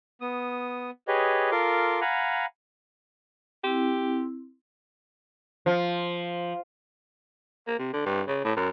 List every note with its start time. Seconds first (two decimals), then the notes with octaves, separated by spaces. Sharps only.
0.21 B3 D#6
1.08 G4 G#4 B4 C#5 D#5
1.52 F4 A4 A#4 C6 D6
2.01 F5 F#5 G#5 A#5 B5
3.64 C4 E4 G4
5.66 F3
7.67 A#3
7.79 C3
7.93 D3
8.05 G2
8.28 C#3
8.45 A2
8.56 F#2